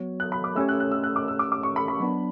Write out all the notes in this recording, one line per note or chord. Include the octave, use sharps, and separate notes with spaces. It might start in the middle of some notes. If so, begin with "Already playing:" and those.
Already playing: F#3 B3 F#4 C#5
F#6
B5
D6
A3 C#4 G4 C#5 E6
F#6
F#6
E6
F#6
D6
E6
D6
D6
C#6
B5
B5
F#3 B3 D4